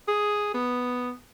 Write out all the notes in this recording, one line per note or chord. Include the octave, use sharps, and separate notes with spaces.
G#4
B3